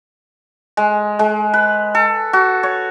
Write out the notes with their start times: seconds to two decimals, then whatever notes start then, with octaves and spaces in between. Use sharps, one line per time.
0.77 G#3
1.19 G#3
1.54 B4
1.95 A4
2.33 F#4
2.63 C#5